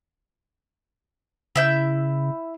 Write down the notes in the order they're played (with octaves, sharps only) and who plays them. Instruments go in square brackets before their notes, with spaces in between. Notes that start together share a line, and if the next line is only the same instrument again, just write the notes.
[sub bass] C#3 [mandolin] E4 E5 G6